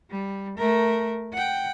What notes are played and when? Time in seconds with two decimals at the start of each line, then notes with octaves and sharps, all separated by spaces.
0.11 G3
0.57 A3 A#4
1.33 F#5 G5